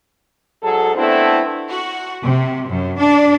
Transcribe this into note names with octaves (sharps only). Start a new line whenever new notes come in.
G#2 F#3 G#4 A4
A3 B3 C4 D4 E4
F#4
C3
F#2
D4